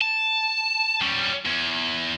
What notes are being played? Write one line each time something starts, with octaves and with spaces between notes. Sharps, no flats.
A5
G3 C#4
E2